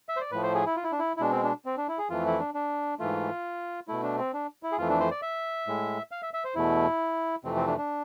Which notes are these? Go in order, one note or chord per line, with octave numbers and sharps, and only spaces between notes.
E5
C5
D5
A2 F3 A3 B4
C5
G#4
E4
F4
E4
D4
E4
E4
B2 G#3 D4
C4
D4
C4
D4
E4
G#4
F2 E3 A3 F4
E4
D4
D4
G#2 E3 A3 F4
B2 A3 E4
D4
C4
D4
E4
G#4
F2 E3 A3 F4
D4
C5
D5
E5
A2 G#3
F5
E5
E5
C5
E2 B2 A3 E4
F2 C3 E3 A3 C4
C4
D4
D4